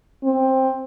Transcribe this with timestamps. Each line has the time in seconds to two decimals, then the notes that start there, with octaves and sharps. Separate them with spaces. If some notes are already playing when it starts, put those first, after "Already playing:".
0.23 C4